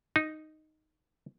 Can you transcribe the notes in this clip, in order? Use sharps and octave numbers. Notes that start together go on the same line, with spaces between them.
D#4